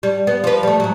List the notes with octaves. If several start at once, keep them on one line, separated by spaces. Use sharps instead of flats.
G3
B3
F3 B4
G3 A3
G#2 F#3